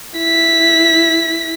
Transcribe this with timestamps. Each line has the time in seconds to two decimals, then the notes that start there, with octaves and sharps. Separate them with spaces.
0.18 E4 B6